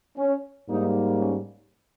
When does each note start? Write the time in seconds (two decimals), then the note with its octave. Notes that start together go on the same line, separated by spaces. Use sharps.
0.17 C#4
0.69 G#2 G3 A#3 D#4
1.19 C#4